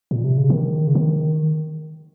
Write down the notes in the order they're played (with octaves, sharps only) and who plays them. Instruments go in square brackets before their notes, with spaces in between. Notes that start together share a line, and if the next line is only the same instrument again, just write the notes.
[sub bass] A#2
C3
C#3
D#3
C#3
D#3